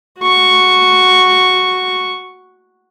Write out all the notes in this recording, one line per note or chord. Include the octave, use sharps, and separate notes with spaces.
F#4 C#6